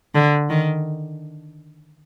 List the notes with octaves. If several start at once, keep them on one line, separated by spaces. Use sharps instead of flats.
D3
D#3